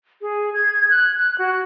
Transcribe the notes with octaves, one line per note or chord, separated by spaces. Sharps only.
G#4
G#6
F#6
F#6
F#4